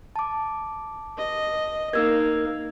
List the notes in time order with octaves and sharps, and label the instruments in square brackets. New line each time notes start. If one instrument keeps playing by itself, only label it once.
[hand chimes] A5 D6
[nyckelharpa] D#5
[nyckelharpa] A#3 D#4 [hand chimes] E6 G#6